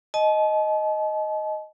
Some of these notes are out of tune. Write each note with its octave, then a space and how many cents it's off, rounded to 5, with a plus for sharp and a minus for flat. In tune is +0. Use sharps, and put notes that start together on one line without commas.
D#5 +0 A5 -40